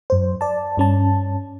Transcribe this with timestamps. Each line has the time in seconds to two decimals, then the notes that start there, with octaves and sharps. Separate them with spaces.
0.10 F#2 C5
0.41 D5 A5
0.77 G2 C#4 A5